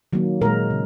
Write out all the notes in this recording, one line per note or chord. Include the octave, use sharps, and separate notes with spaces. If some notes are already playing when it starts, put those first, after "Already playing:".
D#3 F#3 A#3
A#2 G#3 A#4
C#3